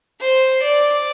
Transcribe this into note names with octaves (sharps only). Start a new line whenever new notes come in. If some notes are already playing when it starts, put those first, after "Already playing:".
C5
D5